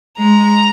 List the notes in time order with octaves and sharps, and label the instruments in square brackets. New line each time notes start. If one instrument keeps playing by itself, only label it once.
[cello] G#3 [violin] A#5